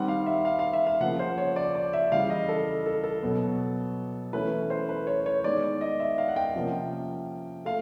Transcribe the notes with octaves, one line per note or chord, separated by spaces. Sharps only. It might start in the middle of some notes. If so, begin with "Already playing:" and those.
Already playing: D#3 G3 C4 F#5
F5
E5
F5
F5
E5
F5
C#3 F3 A#3 F#5
C5
C#5
D5
D5
E5
C#3 E3 G3 F5
D#5
A4
A4
A4
B2 F#3 B3
E3 A3 C#4 B4
C5
B4
C#5
C#5
D#3 G#3 B3 D5
D#5
E5
F5
F#5
G5
C3 F3 A#3 C#4
A3 F5